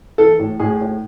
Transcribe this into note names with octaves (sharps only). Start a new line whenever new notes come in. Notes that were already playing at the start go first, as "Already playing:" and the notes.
E3 A4
A2
A2 G#4
A2